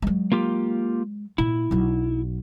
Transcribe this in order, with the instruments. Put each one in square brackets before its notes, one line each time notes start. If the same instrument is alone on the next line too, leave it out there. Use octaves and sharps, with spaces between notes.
[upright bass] F#3 G#3
[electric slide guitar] A#3 F4 G4
[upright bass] A#2 [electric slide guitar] E4
[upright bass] B1 F#3